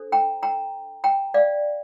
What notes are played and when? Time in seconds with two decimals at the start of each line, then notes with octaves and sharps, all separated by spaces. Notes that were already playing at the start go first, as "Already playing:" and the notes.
Already playing: D4 A4 C5
0.12 G5 A#5
0.43 G5 A#5
1.04 G5 A#5
1.34 D5 F5